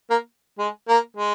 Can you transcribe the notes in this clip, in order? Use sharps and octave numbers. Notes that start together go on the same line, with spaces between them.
A#3
G#3
A#3
G#3